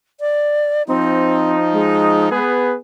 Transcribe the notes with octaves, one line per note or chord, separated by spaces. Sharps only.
D5
F3 C4 D#4
G#3
B3 G#4 B4